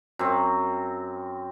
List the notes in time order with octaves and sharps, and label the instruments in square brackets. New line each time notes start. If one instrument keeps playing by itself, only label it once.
[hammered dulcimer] F#2 C4